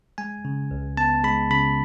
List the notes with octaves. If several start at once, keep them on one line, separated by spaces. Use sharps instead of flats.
G#3 G#5
C#3
C#2
B3 A5
G#3 B5
C#3 B5